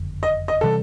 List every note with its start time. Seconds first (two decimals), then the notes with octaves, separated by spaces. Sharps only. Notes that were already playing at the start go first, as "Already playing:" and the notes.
Already playing: F#1 F2 D3
0.23 D#5
0.48 D#5
0.61 C3 E3 G3 A4